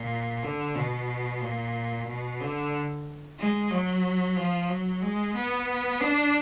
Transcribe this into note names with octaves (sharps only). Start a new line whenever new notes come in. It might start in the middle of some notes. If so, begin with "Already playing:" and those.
Already playing: A#2
D3
B2
A#2
B2
D3
G#3
F#3
F3
F#3
G#3
B3
D4